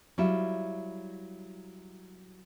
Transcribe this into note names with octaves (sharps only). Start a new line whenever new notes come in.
F#3 G3 E4 F4